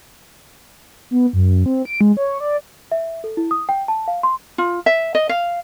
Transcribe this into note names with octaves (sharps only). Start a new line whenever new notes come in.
B3
F#2
C4
D7
G#3
C#5
D5
E5
A4
E4
D#6
G5
A5
F5
C6
F4
E5
D#5
F5